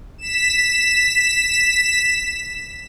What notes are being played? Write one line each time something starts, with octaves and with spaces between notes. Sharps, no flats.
B6 E7